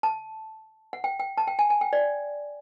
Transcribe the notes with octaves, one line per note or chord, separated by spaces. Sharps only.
A5
F#5
G5
G5
A5
G5
G#5
G#5
G5
D5